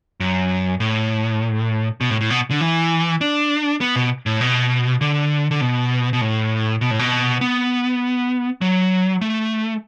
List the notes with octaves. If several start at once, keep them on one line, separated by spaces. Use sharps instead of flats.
F#2
A2
B2
A2
A2
B2
D3
E3
D4
B3
B2
A2
B2
D3
D3
B2
B2
A2
B2
A2
B2
B3
F#3
A3